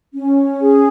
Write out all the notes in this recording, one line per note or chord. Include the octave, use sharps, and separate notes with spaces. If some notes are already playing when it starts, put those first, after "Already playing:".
C#4
G#4